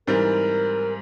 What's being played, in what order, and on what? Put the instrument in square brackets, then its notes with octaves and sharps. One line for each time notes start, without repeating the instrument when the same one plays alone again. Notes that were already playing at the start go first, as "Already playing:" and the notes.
[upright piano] G#2 E3 G3 C4 [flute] A#4